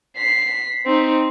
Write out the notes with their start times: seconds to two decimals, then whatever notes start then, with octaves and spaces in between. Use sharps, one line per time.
0.17 B6 C7
0.86 C4 D#4